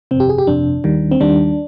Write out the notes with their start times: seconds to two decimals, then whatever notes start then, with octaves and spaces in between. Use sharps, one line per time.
0.11 G1 F2 C3 C4
0.20 G4
0.29 G#4
0.38 G4
0.47 G1 F2 C3 D4
0.84 D#2 D#3 G3
1.11 C4
1.20 D#2 D#3 G3 D4